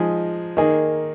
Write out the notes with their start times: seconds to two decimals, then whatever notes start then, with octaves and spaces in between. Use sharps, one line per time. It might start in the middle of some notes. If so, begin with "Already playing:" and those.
Already playing: F3 G#3 D#4 G#4
0.57 D#3 A#3 D#4 G#4